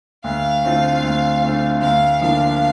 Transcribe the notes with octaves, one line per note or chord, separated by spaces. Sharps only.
D2 F5
D3 A3 C4 F4
D2
D3 A3 C4 F4
D2 F5
D3 F3 A#3 D4 F5